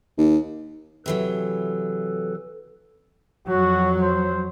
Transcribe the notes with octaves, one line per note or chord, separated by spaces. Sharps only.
D#2
C3 E3 F#3 A4 B4
F2 F#3 F#4
C5